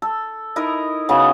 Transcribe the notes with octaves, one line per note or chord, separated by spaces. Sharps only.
A4
D#4 E4 A#4 D#5
C#3 B3 F#4